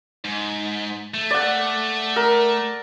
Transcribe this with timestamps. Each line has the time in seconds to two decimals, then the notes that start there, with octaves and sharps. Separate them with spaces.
0.25 G#2
1.14 A3
1.31 D5 F#5
2.16 A#4